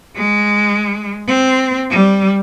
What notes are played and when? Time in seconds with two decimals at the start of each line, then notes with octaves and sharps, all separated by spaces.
0.16 G#3
1.27 C4
1.90 G3